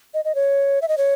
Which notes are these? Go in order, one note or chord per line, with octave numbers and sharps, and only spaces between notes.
D#5
D#5
C#5
E5
D#5
C#5